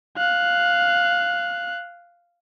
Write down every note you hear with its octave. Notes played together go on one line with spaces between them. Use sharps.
F5 F#6